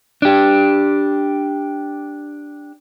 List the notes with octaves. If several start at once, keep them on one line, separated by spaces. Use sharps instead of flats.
D4 G4